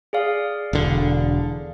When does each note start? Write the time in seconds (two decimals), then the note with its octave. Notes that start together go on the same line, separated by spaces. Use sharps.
0.13 G#4 D5 F5
0.73 E1 D3